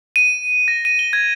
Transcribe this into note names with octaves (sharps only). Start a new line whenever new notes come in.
D#7
A#6
D#7
G7
G#6